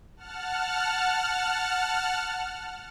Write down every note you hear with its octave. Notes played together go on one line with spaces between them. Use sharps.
F#5 A5 F6